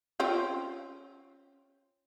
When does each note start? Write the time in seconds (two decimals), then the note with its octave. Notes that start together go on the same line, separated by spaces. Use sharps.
0.20 C4 C#4 F4